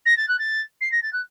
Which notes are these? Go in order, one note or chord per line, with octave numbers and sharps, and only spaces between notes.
A#6
A6
F#6
A6
C7
A#6
A6
F#6